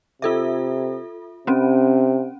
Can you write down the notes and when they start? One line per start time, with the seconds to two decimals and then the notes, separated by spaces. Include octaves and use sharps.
0.22 C3 F4 A4 E5
1.47 C3 C4 C#4